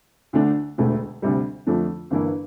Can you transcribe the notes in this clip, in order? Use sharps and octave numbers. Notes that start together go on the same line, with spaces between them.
D2 D3 A3 D4
E1 D2 D3 A3
D2 C3 G3
F2 D3 F3 A3 D4
G1 G2 E3 A#3 E4